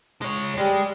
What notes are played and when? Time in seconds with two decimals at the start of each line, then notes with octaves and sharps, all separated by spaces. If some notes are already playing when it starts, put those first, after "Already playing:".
0.22 G#3 C#5
0.58 G3 G#3